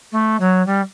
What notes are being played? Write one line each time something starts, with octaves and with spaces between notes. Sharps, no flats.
A3
F#3
G3